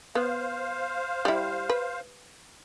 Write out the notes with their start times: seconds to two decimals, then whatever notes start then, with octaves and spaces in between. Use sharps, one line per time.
0.15 B3 C5 F5
1.25 G3 E4
1.69 B4